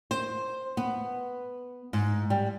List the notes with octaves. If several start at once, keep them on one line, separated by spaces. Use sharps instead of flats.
C5
B3
G#2
G3